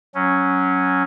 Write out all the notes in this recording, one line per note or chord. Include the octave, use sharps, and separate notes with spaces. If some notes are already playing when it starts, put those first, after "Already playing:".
F#3 C#4